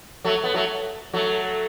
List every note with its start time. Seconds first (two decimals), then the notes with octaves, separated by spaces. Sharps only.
0.24 F#3 A3
0.44 B3
0.54 F#3 A3
1.13 F#3 A3